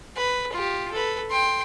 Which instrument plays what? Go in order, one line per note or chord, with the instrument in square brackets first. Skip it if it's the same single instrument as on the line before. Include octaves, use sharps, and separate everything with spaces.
[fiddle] B4
F4 G4
A4 B4
G5 C6